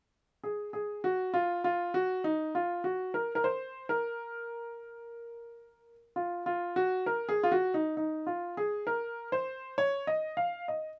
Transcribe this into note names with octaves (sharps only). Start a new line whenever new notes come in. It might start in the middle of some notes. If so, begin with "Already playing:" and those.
G#4
G#4
F#4
F4
F4
F#4
D#4
F4
F#4
A#4
A#4
C5
A#4
F4
F4
F#4
A#4
G#4
F4
F#4
D#4
D#4
F4
G#4
A#4
C5
C#5
D#5
F5
D#5